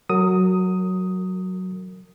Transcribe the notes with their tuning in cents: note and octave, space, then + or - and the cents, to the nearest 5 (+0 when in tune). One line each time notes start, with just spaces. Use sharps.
F#3 +0 A#4 -30 D#6 +10